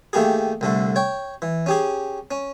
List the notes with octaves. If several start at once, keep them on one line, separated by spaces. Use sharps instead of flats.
D#3 A3 A#3 G4 G#4
C2 D3 A3
C#5 G5
E3
C#4 G4 G#4
C#4